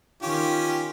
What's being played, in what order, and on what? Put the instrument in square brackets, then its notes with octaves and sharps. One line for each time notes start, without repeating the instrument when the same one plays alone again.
[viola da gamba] D#3 [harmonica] C#4 G4 [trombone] F4